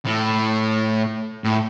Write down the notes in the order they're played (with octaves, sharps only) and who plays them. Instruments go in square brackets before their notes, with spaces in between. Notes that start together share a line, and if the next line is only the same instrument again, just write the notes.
[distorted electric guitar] A2
A2